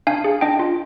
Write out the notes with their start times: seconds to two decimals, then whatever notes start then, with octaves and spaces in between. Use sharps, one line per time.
0.07 D4 F5 G#5
0.24 G#4
0.41 D4 D#5 G5
0.59 F4